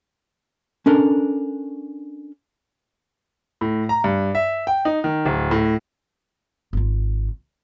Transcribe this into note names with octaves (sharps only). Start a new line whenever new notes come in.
C#4 D4 A4 A#4
A2
A#5
G2
E5
G5
D#4
D#3
D1
A2
G#1 F4